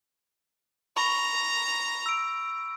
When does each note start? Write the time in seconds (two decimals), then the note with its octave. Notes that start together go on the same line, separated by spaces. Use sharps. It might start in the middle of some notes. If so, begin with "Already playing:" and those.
0.97 A#5 B5 C#6
2.06 E6 D7